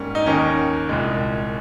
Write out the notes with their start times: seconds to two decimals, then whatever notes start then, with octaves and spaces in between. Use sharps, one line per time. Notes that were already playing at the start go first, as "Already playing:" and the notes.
Already playing: G#2 G3 A#3 C#4
0.15 D#4
0.26 D#2 D#3 A#3 C#4
0.89 C2 A#2 G#3